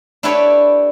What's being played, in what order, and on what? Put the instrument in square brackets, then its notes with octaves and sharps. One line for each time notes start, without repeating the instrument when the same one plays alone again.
[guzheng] D4 E4 G4 A4 B4 C#5